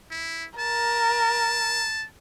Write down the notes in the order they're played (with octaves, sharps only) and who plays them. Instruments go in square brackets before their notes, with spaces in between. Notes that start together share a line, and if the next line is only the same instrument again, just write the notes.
[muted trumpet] E4
[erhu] A#4 [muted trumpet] A5